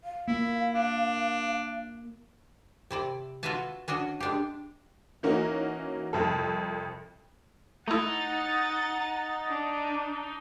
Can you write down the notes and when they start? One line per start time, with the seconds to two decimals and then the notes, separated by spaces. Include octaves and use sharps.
0.04 F5
0.28 A#3 E4
0.75 D4
2.91 C3 E4 D5
3.43 F4 F#4 B4 E5 G#5 A5
3.88 C#4 D4 F#4 D#5
4.20 G#3 D4 G4
5.23 E3 A#3 C#4 D#4 F#4
6.13 C2 F2 A4
7.88 A3 D#4 E4 F#5 A6
9.49 D4